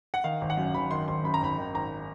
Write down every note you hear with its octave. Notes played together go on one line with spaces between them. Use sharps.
F#5
D#3 F5
G#1
F#5
F#2
G#1 B5
D#3 C6
G#1 C6
F#2 B5
A#5
G#1 B5
D#3
G#1 A#5